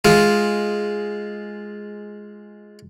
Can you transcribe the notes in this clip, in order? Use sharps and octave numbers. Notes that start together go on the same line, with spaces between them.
G#3 F4